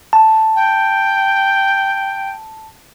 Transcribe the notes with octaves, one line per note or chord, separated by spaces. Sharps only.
A5
G5